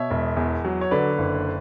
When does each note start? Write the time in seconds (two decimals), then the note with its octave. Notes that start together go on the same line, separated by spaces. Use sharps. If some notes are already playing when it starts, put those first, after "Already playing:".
Already playing: B2 C#5 E5
0.10 E1
0.37 E2
0.65 F#3
0.81 C#5
0.91 D3 B4 D5
1.18 F#1